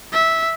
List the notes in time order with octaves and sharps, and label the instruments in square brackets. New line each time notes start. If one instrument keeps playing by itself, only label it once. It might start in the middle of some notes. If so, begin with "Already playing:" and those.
[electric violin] E5